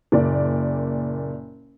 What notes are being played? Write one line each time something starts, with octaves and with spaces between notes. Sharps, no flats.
F#1 A#2 D5